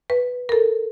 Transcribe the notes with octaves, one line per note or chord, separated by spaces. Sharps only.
B4
A4 A#4